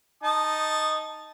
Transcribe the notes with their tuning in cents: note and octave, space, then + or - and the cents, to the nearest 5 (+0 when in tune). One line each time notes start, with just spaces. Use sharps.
D#4 +0 A5 +0 D#6 -15